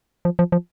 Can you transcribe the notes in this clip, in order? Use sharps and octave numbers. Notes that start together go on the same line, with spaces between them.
F3
F3
F3